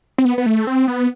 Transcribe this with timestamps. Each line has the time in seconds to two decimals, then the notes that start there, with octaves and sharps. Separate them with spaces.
0.18 C4
0.25 B3
0.38 B3
0.46 A3
0.67 C4
0.88 B3